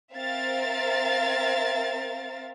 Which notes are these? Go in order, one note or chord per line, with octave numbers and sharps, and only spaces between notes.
C4 A#4 E5 F5 A6